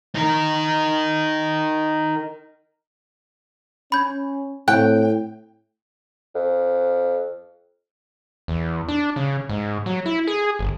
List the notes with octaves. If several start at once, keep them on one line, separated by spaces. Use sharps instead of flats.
D#4 A#4
C#4 B5 G6 G#6
A2 C4 G5 F#6
F2
E2
D4
C#3
G#2
F#3
E4
G#4
G1